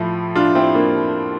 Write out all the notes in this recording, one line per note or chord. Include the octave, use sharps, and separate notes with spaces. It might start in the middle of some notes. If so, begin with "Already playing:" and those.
Already playing: A2 F3 E4
D4 F4
C4 E4
A#3 D4